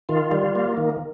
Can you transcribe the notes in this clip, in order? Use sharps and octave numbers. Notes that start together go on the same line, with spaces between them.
D#3 F4
G3
A#3
D#3